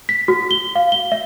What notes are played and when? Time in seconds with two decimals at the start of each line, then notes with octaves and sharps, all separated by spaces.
0.09 B6
0.28 F#4
0.51 G7
0.75 F5
0.92 G7
1.12 E5